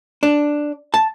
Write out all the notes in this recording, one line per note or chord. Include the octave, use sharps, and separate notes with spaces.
D4
A5